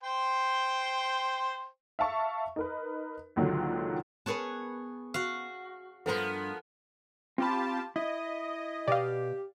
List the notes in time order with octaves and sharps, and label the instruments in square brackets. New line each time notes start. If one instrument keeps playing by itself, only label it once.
[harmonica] C5 G5 C6
[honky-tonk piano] E5 F5 A5 C#6
D#4 A#4 B4
C#2 A#2 D3 D#3 F#3
[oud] B3 A#4 B4 [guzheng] G#4 C#5 A5
[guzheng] F#4 F5
[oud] G2 C5 [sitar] F3 B3 A#4 [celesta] A4
[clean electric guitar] C4 B5 [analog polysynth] F4 G4 A5
[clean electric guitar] E4 [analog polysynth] D#5
[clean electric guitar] B2 [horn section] G4 [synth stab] D5 F5